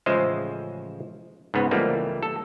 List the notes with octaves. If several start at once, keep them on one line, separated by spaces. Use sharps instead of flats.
A1 C#3 F3 G#3 C5 E5
G#2 C#3 B3
C#2 E3 F3 G3 A3 A#3
A4